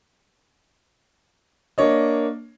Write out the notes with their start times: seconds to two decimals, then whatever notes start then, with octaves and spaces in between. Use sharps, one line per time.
1.78 A#3 D4 C#5 D#5